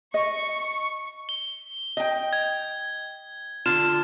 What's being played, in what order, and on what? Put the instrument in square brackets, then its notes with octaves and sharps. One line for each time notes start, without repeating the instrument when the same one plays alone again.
[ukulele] D#5 [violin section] C#6
[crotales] G7
[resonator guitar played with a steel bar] D#5 G5
[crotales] G#6
[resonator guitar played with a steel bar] D3 F4 [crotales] F6 E7